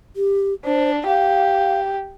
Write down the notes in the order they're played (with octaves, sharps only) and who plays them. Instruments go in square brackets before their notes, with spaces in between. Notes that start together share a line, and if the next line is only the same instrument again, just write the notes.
[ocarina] G4
[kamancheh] D4 [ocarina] C5
[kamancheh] G4 [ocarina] F5